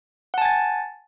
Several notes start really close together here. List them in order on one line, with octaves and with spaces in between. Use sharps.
F#5 A5 G#5 A6